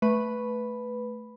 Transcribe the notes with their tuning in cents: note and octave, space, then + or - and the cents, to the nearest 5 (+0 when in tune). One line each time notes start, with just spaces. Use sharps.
A3 +0 B4 +0 B5 +0